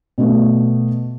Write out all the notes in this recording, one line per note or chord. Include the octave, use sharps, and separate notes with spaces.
B2 A3 B3